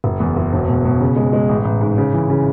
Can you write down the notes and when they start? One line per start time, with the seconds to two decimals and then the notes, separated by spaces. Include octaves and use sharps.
0.04 F#1
0.20 E2
0.37 F#1
0.53 E1
0.69 B2
0.85 B2
1.00 C#3
1.16 G#3
1.33 G#3
1.49 A1
1.65 A1
1.81 G#2
1.98 C#3
2.13 E3
2.30 C#3